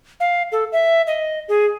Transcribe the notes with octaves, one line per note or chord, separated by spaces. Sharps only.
F5
A4
E5
D#5
G#4